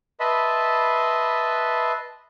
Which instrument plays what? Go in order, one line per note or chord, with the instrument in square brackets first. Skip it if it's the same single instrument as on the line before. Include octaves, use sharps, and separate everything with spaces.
[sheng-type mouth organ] B4 D#5 E5 A5 B5 C6